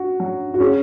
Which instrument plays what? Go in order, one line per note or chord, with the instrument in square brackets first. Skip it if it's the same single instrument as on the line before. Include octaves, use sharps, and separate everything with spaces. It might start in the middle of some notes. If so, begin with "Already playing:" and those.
Already playing: [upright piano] F#4
F#3
[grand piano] F#4
[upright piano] C#4 [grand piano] G#4